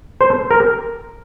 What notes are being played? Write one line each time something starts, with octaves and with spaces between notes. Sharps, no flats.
C5
A#4